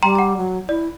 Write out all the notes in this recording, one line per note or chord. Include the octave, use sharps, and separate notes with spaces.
G3 G5 A#5 C6
F#5 A#5
F#3
E4 D5